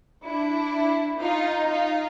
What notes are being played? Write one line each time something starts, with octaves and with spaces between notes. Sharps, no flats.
D4 E4
D#4 F4
D#4 F4